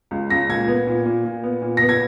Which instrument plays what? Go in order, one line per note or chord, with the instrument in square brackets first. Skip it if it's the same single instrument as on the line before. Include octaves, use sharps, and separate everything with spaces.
[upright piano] C#2
C#2 A#6
A#2 G#6
B3
A#2
A#2
A#2
B3
A#2
B3 A#6
G#6